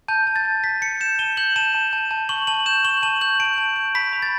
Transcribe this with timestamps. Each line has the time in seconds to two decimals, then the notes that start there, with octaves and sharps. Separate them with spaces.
0.08 A5 G6
0.27 A5
0.36 A6
0.45 A5
0.64 A5 B6
0.81 A5 C#7
1.00 G6 E7
1.19 A5 G7
1.37 G6 F#7
1.56 A5 E7
1.74 A5
1.93 A5
2.11 A5
2.29 C#6 F#7
2.47 A5 F#7
2.66 G6 E7
2.85 C#6 F#7
3.02 A5 F#7
3.21 G6 F#7
3.40 A5 D7
3.58 A5
3.76 G6
3.95 B5 B6
4.13 B5
4.22 A6